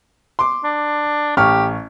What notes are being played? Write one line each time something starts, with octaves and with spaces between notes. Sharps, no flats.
C6 D6
D4
A1 G4 C#6 F6